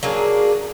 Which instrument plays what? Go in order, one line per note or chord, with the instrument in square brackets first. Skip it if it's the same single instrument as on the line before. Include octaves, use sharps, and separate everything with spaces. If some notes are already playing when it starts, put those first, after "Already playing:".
[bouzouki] F#3 A#3 D4 G#4